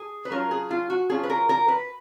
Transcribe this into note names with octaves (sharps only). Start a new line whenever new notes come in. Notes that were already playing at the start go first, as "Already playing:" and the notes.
Already playing: G#4
B4
F#3 C#4 F4 A#4
G#4
F4
F#4
F#3 C#4 F4 G#4
B4
A#4
A#4
B4